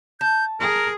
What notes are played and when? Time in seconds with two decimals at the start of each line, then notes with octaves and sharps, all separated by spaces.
0.21 A5 G6
0.60 G#4 A#4 A#5